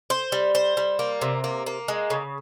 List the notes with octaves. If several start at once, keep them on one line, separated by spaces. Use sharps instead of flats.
C5
G3
C5
G3
A#3
C3
A#3
A#3
G#3
C#3